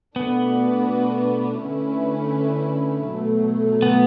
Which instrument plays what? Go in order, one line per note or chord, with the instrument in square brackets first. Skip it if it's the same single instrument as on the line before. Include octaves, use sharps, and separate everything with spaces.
[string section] B2 A3 D4 F#4 B4 [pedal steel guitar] B3
[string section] D3 A3 C#4 E4 B4
B2 F#3 A3
[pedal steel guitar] B3